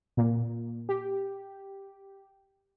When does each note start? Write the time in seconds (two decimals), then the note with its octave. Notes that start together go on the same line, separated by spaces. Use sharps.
0.17 A#2
0.89 G4